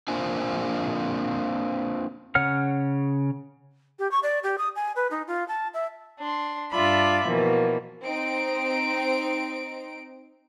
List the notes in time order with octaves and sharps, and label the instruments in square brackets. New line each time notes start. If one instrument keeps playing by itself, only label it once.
[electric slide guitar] A#3 C4 D4 F4 C5 G#5
[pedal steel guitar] C#3 C#5 F#5 F6
[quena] G4
C#6
D5
G4
D#6
G#5
B4
D#4
F4
A5
E5
[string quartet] D4 C6
G2 D4 F4 D5 E5 B5
B2 E3 F3 A#3
[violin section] C4 D#4 D7